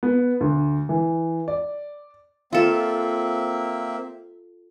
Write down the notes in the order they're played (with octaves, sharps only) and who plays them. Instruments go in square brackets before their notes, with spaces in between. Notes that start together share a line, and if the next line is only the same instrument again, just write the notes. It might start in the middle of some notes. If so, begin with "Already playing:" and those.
[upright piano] B3
D2
E3
D5
[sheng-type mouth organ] A#3 C4 E5 [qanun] F4 A4